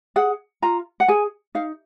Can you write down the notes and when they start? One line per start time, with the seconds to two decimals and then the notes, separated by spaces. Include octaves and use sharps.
0.16 G#4 F#5
0.62 F4 A#5
1.00 F#5
1.08 G#4 G#5
1.55 D#4 F5